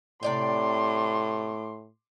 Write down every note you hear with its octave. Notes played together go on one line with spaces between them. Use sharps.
A2 C3 D5 G5 C6 D6